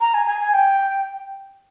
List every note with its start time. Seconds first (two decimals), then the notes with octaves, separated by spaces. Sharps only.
0.01 A#5
0.14 G#5
0.27 G#5
0.41 G#5
0.54 G5